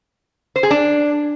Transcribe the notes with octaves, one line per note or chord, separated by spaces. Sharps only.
C5
G#4
D4